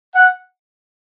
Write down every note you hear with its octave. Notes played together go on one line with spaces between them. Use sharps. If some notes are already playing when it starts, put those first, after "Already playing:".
F#5